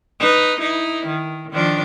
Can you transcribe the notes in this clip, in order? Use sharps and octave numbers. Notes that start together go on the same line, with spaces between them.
D#4 B4
D#4 E4
D#3
D#3 F3 D4